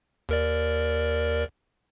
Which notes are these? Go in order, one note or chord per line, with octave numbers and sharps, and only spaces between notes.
D#2 A#4 D5